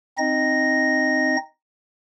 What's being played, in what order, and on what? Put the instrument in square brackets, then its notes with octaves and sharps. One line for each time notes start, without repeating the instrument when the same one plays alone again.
[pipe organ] C4 D#4 D#5 A#6